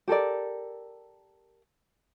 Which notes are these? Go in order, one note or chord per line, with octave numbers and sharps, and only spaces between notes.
G4 A4 A#4 D5